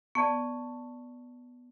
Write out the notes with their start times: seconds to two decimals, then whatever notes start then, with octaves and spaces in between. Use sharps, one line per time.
0.15 B3 D5 A5 C#6